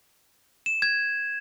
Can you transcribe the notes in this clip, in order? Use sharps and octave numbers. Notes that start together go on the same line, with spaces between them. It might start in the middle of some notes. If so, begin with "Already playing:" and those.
E7
G#6